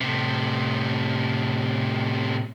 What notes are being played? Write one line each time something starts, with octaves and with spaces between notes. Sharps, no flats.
A2 C3